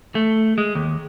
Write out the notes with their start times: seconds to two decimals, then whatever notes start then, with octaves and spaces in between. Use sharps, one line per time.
0.15 A3
0.58 G#3
0.75 D#2